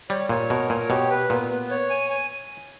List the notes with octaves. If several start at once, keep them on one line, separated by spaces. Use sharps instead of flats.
G3 C#5
A#2 C#5
B2 A#4
A#2 C#5
B2 G4
B4
A#2 B3
B3
C#5
G#5
G#5